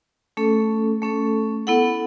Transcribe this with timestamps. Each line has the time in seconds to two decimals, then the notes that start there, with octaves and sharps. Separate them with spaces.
0.37 A3 C#4 A4
1.02 A3 C#4 A4
1.67 B3 E4 A4 F#5